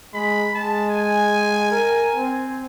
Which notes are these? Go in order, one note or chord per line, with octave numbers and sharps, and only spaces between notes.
G#3 B5
G#3 A5
G#5
A#4
C4